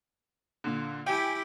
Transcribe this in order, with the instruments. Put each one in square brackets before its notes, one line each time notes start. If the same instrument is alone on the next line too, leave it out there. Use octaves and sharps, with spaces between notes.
[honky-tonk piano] A#2 D3
[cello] E4 G4 [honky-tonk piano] G5 G#5